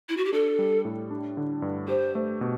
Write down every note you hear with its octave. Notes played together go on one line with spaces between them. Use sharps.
E4
F#4
G4
D4 A4
G3
A2
D4
D3
G2
G4 C5
A3
B2